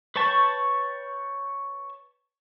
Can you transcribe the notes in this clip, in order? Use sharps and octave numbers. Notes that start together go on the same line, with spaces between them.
B4 C#5 G5 A5 C#6